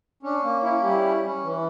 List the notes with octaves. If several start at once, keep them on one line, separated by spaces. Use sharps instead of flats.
C#4 D4
A#3
C#4 E4
G3 E4 G4
C#4
C#4
E3